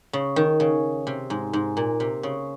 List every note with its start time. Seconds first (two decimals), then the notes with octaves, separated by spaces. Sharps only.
0.13 C#3
0.36 D#3
0.60 C#3
1.07 C3
1.30 G#2
1.53 G#2
1.77 A#2
2.00 C3
2.23 C#3